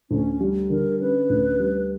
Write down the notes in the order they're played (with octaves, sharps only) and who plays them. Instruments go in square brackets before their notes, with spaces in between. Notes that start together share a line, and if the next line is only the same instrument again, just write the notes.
[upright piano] D2 [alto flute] C#4
[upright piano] G3
[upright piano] D3 [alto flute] A#4
[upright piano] C#4 [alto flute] B4
[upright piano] D2
G3